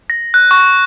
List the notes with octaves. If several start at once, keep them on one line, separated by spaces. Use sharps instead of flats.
A#6
F#6
C#6